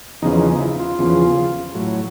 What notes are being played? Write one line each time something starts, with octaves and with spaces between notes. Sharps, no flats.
E2 C#3 F3 D#4
D#4
E4
F4
E2 C#3 F3
A2 F#3